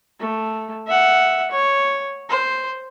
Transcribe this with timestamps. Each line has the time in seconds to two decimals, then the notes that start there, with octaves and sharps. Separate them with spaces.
0.20 A3
0.87 E5 F#5
1.51 C#5
2.29 C5